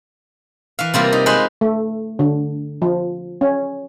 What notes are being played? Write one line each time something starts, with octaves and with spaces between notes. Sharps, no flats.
E3 E5 F5
C3 G3 A#3 F4
D#4
G#3 D#4 B4 C5 G#5 B5
A3
D3
F3
C#4